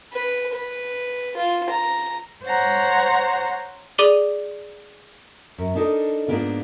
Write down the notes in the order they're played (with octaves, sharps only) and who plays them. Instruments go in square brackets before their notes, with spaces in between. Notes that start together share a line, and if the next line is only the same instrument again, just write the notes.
[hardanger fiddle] B4
B4
F4
A#5
[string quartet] C5 C#5 F#5 A#5
[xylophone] G#4 D5 D6 D#7 F#7 G7
[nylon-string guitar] F#2
D4 D#4 A4 A#4 D#5
G#2 C3 A#3 B3 D4 F4